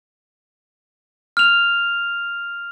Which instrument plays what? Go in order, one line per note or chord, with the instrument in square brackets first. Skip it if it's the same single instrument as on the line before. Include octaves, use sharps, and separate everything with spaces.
[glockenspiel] F6 F7